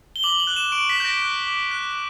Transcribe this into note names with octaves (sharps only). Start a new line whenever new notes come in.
G7
D6 F#7
G7
F#7
F#6
E7
C#6 D7
B6
F#6 G6
A#6
F#6
D6
F#6